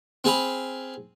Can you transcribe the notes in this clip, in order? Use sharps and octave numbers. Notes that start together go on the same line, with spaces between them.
C4 G#4 F5 B5